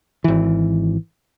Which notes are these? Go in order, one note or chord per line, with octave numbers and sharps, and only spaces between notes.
G#1 E3